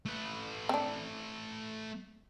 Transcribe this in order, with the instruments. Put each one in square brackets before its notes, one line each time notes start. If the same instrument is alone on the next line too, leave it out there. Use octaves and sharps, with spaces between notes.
[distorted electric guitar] A3 B4
[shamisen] C4 D4